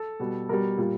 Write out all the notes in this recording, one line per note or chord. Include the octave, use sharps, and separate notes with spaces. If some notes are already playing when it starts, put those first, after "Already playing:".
Already playing: A4
B2 G3
B2 G3 A#4
A#2 G3